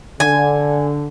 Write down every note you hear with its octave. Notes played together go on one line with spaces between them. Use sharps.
D3 G#5